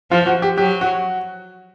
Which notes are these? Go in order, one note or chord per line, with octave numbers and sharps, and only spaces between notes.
F3 F4
F#4
G4
F#3 G4
F#4